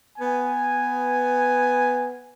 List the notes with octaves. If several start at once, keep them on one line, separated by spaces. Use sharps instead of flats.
B3 G#5